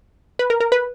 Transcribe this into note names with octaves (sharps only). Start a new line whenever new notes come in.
B4
A#4
A#4
B4